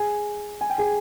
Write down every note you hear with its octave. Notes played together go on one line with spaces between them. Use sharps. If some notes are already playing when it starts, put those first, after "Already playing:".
Already playing: G#4 G#5
G#5
G5
G#4 G#5